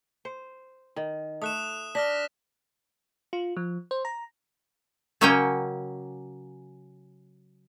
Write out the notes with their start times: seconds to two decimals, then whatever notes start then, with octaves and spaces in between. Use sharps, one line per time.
0.25 C5
0.96 D#3
1.42 A3 D#6 F#6 E7
1.95 D4 F6 A#6 B6
3.33 F4
3.57 F3
3.91 C5
4.05 A#5
5.21 C#3 F#3 A#3 C#4 D#5 G5